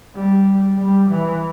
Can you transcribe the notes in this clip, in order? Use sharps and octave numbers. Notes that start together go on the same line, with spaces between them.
G3
G3
E3